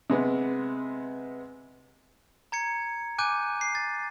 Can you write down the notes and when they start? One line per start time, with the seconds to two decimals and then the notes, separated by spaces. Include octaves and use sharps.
0.10 C3 G#3 B3
2.52 A#5 G#6 C#7
3.18 G#5 D6 F#6 G6 D#7
3.61 C7
3.75 A6